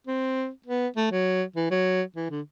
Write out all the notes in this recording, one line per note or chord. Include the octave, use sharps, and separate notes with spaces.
C4
B3
A3
F#3
E3
F#3
E3
D3